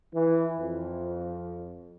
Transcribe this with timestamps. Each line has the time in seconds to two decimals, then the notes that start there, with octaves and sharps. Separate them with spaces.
0.14 E3
0.57 F2